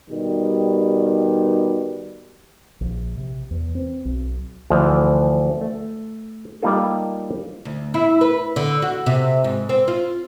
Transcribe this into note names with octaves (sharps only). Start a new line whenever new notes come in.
B2 D#3 G3
A#1
C3
E2
C4
B1
D2 E3 F3
A3
G3 A#3 D#4 F4 A4
D2
E4
B4
D3
F#4
C3
G#2
C4
F4